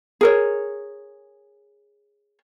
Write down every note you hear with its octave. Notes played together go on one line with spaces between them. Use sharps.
G#4 A#4 C#5